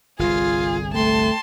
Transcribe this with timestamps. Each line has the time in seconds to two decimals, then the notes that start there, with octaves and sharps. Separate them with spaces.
0.19 G1 C2 F4 G#4
0.94 A3 G5 A5 C6